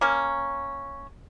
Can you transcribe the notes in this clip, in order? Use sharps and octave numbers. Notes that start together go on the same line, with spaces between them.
A#3 C#4